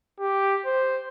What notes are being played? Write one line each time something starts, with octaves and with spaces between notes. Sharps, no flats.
G4
C5